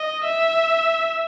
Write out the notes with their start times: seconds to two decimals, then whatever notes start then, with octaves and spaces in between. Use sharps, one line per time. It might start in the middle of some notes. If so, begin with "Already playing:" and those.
Already playing: D#5
0.25 E5